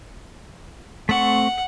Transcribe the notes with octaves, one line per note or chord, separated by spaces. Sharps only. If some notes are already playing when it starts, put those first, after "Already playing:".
A3 C4 F#5 C#6